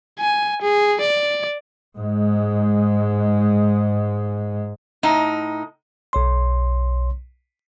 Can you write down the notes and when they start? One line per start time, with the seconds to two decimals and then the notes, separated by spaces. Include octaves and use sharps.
0.20 G#5
0.62 G#4
1.01 D5
1.98 G#2 G#3
5.03 A2 D#4
6.13 B1 C#5 C6